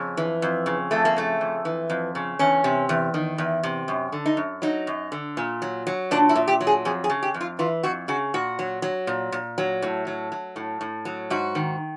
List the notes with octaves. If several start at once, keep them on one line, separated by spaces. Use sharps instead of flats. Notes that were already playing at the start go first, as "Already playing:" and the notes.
Already playing: F2 C#3
E3
F2
C#3
F2 A3
A#3
C#3 A3
F2
E3
F2
C#3
E2 C#4
C3
E2
D#3
E2
C3
F#2
D3
D#4
F#2
F#3 D#4
F#2
D3
A#2
F#3
F#3
A#2 D4
E4
A#2
G4
F#3
G#4
F2 G#4
G#4
C#3
G4
F2
F4
E3 F4
F2 F#4
C#3 F#4
A#2 F#4
F#3
F#3
A#2
A#2
F#3
A2
F#3
F#3
A2
A2
F#3
G#2 F#4
D#3